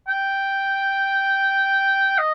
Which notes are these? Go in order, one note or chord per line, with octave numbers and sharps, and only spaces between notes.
G5
D#5